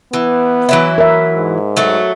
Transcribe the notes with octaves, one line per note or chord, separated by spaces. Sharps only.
E3 B3
E3 F#3 E4
A#4 E5
G#2
F#3 A3